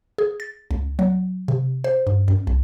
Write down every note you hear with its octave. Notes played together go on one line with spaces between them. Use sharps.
G#4
A6
C#2
F#3
C3
C5
G2
F#2
C2